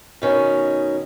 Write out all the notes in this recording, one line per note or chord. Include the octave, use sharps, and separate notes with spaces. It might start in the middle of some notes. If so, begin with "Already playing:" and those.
B2 D#3 C#4